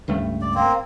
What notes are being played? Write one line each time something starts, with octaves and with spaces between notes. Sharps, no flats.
C#2 G2 A3
D5
A#3 C4